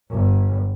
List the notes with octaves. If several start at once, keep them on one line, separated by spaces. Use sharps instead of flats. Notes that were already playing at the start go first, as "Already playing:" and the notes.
G1